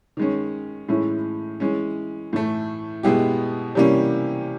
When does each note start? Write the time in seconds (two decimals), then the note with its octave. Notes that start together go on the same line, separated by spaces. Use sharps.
0.17 D#3 G#3 C#4
0.88 A2 E3 G#3 C#4 E4
1.60 E3 G#3 C#4
2.33 A2 E3 A3
3.03 B2 G#3 B3 E4 G4
3.75 C3 E3 G3 A#3 C#4